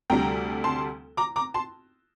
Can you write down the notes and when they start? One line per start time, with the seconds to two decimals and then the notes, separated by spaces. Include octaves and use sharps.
0.10 D2 C3 G3 D4 G5 A#5
0.64 A5 C6
1.17 A#5 D6
1.36 A#5 D6
1.54 A5 C6